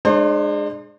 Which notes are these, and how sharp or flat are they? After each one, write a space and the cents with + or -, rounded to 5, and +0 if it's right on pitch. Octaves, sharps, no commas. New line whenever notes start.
G#3 +0 D4 +40 C5 +30